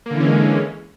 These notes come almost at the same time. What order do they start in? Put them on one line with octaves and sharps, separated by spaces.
A#3 D3 E3 C#4 G#3